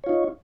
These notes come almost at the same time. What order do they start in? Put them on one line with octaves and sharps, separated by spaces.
C#5 F4 D#4